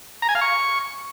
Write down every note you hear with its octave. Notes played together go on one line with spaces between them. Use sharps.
A#5
G#5
F5
C#6